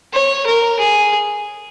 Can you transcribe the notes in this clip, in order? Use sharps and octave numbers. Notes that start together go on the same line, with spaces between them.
C#5
A#4
G#4